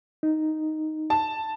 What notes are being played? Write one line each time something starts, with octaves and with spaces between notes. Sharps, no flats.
D#4
A5